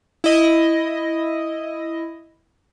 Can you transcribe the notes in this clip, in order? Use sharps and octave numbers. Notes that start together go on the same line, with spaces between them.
E4 D#5